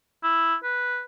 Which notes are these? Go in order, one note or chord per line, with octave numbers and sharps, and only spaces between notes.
E4
B4